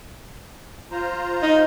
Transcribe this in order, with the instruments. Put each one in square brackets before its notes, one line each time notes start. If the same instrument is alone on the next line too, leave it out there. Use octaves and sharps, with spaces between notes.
[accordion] F4 C5 A#5
[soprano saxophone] D#4